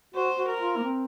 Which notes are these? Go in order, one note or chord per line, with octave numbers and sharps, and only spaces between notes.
F#4 C5
F#4
A#4
F4
A#3
C4